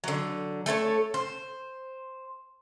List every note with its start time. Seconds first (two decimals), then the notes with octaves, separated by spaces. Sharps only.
0.04 D3 F#3
0.66 A3 A4 B4 C#5
1.14 C5